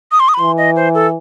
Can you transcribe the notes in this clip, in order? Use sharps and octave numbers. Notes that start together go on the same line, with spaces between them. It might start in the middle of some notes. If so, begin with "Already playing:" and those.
D#6
C6
D#6
B5
E3 C6
D#5
C5
A4